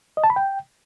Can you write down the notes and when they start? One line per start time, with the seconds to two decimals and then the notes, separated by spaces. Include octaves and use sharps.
0.17 D#5
0.24 A5
0.30 B5
0.36 G5